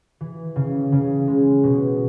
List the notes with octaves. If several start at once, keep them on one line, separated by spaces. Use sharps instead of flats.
E3
C#3
C#3
G#3
B2